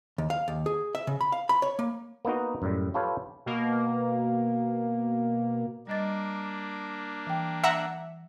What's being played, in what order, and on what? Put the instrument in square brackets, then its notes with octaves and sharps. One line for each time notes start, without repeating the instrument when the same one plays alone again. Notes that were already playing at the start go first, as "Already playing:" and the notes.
[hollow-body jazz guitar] D#2
F5
D#2
G#4
E5
C#3
B5
F5
B5
C#5
A#3
[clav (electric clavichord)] A#3 B3 D#4 F#4
F#2 A2 G3
F4 G4 A4 B4 C#5 F5
[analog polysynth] B2 A#3
[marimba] G3 D#5 A6 [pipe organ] A#3 D4
[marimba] E3 G5
[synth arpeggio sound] E5 F#5 A#5